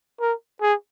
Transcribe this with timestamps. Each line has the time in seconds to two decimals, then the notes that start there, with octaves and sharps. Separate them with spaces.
0.21 A#4
0.61 G#4